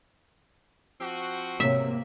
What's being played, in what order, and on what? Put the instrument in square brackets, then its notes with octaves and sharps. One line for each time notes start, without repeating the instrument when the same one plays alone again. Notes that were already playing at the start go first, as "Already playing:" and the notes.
[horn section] F3 C4 F#4
[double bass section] G#2 C3 A#3 [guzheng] E5